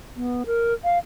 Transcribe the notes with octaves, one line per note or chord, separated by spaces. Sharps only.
B3
A#4
F5